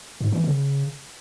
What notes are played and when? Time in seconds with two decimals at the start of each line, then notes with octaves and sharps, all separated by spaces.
0.21 G#2
0.32 E3
0.44 C#3